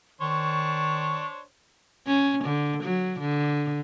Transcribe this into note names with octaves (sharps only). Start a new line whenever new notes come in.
D#3 D4 C5 C#5 C#6
C#4
D3
F#3
D3